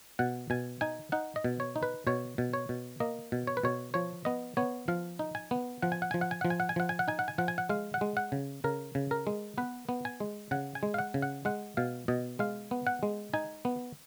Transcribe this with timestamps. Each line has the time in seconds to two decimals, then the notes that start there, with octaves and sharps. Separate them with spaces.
0.19 B2 F#5
0.50 B2 G#5
0.81 D#4 G#5
1.12 D#4 F#5
1.36 D#5
1.44 B2
1.60 C#5
1.76 D#4
1.83 B4
2.07 B2 C#5
2.38 B2
2.53 C#5
2.69 B2
3.00 A#3 D#5
3.32 B2
3.47 C#5
3.57 B4
3.63 B2 C#5
3.94 F3 C#5
4.25 B3 D#5
4.57 B3 C#5
4.88 F3 F5
5.19 D#4
5.35 G#5
5.51 B3
5.82 F3 F#5
5.92 G#5
6.02 F#5
6.11 F3 G#5
6.21 F#5
6.31 G#5
6.41 F3 F#5
6.50 G#5
6.60 F#5
6.69 G#5
6.76 F3 F#5
6.89 G#5
6.99 F#5
7.08 D#4 G#5
7.19 F#5
7.28 G#5
7.38 F3 F#5
7.48 G#5
7.58 F#5
7.69 G#3 F5
7.94 F#5
8.01 G#3
8.17 F#5
8.32 C#3
8.64 C#3 A#4
8.95 C#3
9.11 A#4
9.27 G#3
9.58 B3 B4
9.89 B3
10.05 G#5
10.20 G#3
10.51 C#3 F#5
10.75 G#5
10.83 G#3
10.94 F5
10.98 F#5
11.14 C#3
11.22 F#5
11.45 G#3 F#5
11.77 B2 F5
12.08 B2 D#5
12.39 G#3 F5
12.71 B3
12.87 F#5
13.03 G#3
13.33 D#4 G#5
13.65 B3